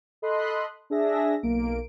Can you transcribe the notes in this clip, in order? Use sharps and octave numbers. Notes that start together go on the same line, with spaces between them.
A4 D#5 B5 C6 D#6 F#6
D4 G#4 E5 A#6
B1 A#3 D7